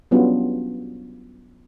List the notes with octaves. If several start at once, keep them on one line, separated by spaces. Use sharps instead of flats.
F#3 G3 B3 C#4 D4 F4